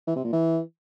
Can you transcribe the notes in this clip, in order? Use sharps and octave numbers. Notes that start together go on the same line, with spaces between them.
E3
C3
A#2
E3